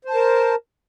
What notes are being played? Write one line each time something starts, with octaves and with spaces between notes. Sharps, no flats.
A#4 C5 A5